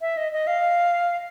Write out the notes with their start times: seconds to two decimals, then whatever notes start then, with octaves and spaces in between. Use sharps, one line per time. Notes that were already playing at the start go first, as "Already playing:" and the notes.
0.01 E5
0.17 D#5
0.33 D#5
0.47 F5